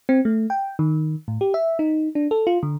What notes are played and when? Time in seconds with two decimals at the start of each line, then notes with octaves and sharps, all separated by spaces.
0.09 C4
0.25 A3
0.50 G5
0.79 D#3
1.28 A2
1.41 G4
1.54 E5
1.79 D#4
2.15 D4
2.31 A4
2.47 F4
2.63 D3